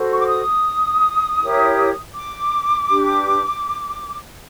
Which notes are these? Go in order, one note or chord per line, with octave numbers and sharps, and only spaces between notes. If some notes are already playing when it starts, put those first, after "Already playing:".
Already playing: F#4 A4 C5
C#6
D6
D#6
E4 G4 A#4 C#5
D6
D4 G4 B4